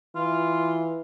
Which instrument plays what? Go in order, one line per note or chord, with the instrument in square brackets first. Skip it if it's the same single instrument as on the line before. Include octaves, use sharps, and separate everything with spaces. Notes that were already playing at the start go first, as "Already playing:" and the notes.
[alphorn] E3 [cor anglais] F4